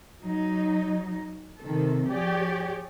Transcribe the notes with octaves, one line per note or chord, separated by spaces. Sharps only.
F#3 D#4
C3 D#3 A4
F3 G4 G#4 C#5 D5